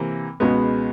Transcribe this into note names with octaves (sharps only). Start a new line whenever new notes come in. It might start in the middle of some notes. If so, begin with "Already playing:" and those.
Already playing: C3 E3 A#3
C#2 B2 G#3 B3